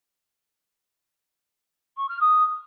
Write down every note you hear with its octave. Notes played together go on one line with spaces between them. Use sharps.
C#6
F6
D#6